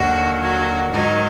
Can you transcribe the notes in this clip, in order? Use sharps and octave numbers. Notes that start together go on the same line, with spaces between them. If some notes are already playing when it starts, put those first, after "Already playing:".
Already playing: D#2 D3 F#3 F#4
F#3 F#4
G#2 D#3 F#3 D#4